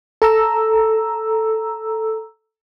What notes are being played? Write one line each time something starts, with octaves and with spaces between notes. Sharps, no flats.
A4 A#5 E6